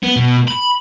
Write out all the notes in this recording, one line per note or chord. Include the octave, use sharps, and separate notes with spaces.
B3
B2
B5